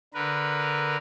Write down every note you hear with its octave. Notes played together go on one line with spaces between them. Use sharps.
D3 A#4 B4